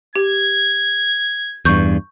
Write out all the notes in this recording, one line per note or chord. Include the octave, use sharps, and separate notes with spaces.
G4 G#6
E2 G2 C#6 G6